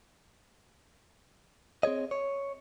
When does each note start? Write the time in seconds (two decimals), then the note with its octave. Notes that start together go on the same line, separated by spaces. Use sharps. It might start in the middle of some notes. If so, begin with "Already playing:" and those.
1.83 C4 G#4 C#5 D#5
2.11 C#5